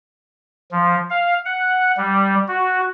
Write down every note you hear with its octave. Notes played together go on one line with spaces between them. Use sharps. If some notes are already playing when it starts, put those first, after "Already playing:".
F3
F5
F#5
G3
F#4